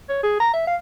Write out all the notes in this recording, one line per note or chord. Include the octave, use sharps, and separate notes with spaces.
C#5
G#4
A#5
E5
F5